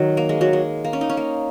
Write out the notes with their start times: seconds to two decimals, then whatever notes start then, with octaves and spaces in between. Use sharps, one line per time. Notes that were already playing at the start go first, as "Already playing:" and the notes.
Already playing: D#3 F#3
0.17 A#3
0.29 G#3
0.41 F#3
0.53 G#3
0.84 A#3
0.93 C#4
1.01 D#4
1.10 C#4
1.17 A#3